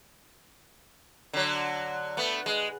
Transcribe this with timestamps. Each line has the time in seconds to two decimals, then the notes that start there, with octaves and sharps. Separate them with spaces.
1.33 D3 F#3
2.17 A3 B3
2.46 G#3